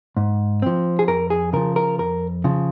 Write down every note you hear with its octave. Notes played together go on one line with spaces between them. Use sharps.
G#2
F3 C4
G#4
F2 A#4
G#4
C#3 F3 A#4
A#4
F2 A#4
C#3 F3